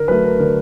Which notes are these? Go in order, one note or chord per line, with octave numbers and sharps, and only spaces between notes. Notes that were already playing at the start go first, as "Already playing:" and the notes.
Already playing: D3 A#4
F#3 A3 B4
A#4
D3 A#4